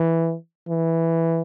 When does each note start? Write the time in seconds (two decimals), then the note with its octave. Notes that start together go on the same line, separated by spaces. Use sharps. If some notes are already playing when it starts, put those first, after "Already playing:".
Already playing: E3
0.69 E3